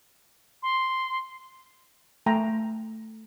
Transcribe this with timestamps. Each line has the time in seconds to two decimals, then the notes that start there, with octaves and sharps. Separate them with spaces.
0.63 C6
2.26 A3 G5 A#5